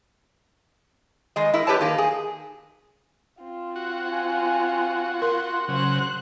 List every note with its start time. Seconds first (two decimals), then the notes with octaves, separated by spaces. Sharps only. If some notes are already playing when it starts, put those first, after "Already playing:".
1.36 D#3 G#3 D#5
1.54 E4 A#4
1.67 F#2 G4 B4 C#5 A5
1.81 D#3 A#3
1.98 G#4
3.41 C4 F4
3.76 F#4
4.12 G#5
5.22 A#4 C6
5.68 C#3 F#3 C5 F#6